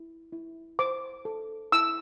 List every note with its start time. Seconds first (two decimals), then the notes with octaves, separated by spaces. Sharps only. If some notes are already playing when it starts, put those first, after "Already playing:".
Already playing: E4
0.33 E4
0.79 C5 D6
1.25 A4
1.72 E4 E6